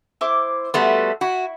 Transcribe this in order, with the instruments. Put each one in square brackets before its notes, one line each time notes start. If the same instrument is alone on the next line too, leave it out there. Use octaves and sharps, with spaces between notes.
[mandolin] E4 C5 D6
[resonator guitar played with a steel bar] G3 A3 B3 [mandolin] F#4 A4 C6
[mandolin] E4 [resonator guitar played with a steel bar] F#4